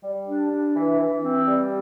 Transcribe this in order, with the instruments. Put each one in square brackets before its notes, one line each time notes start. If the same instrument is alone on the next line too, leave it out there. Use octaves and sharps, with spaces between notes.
[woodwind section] G3
D4
D4
E3
E3
C4
G3